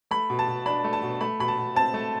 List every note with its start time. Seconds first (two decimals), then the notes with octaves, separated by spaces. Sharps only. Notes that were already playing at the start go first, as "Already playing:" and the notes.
0.11 A3 B5
0.30 B2
0.39 A5
0.48 B2
0.66 D4 B5
0.84 A3
0.93 A5
1.03 B2
1.21 A3 B5
1.39 B2 B5
1.48 A5
1.58 B2
1.75 C4 A5
1.94 A3